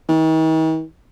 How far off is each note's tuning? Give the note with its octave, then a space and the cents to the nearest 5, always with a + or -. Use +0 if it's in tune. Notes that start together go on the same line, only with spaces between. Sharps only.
D#3 +45